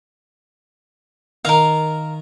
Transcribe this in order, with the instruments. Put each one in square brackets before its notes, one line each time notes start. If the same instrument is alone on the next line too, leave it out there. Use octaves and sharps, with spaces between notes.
[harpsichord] D#3 A#5 [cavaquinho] A#4 F5